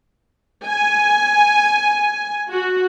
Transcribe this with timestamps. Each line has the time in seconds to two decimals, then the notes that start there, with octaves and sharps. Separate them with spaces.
0.67 G#5
2.49 F#4